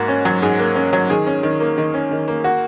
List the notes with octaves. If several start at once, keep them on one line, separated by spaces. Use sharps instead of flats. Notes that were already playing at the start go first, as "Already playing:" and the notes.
Already playing: G#2 A#3 F#4
C#4
F#3
G#2 G#4
A#3
C#4
F#3
D#3 G#4
C#4
D#3
A#3
D#3
C#4
D#3
A#3
F#4